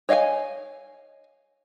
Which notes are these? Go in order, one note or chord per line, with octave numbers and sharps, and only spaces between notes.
C#5 D#5 F5 G5 G#5